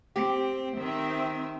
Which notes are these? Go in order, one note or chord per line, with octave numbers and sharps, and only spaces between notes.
C4 G4
D#3 C4 E5